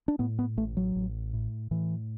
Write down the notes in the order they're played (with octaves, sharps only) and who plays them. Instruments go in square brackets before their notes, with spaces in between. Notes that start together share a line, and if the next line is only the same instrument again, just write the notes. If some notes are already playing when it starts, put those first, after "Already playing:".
[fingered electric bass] D4
A2 B3
B3
A1 A3
F#3
A1
A2
A2 E3